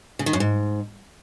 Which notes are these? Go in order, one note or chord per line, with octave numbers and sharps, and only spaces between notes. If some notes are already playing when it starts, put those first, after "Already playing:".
C#3
D#3
F#2
G#2